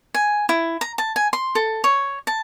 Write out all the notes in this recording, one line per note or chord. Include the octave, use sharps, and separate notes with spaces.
G#5
E4
A#5
A5
G#5
C6
A4
C#5
A5